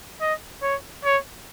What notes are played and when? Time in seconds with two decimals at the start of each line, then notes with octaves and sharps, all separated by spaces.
0.21 D#5
0.62 C#5
1.04 C#5